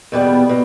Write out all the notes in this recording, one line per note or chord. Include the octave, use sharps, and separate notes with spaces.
E2 B2 G3 B3
B2